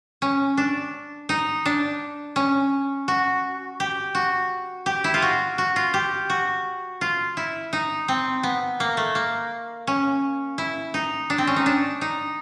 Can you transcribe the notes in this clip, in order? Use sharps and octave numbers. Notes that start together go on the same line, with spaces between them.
C#4
D4
D#4
D4
C#4
F#4
G4
F#4
G4
E4
F4
F#4
F#4
F4
G4
F#4
F4
E4
D#4
C4
B3
A#3
A3
A#3
C#4
E4
D#4
D4
C4
C#4
D#4
D4
D#4